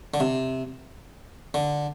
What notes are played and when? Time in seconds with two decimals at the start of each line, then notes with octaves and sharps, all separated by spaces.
0.14 D3
0.20 C3
1.54 D3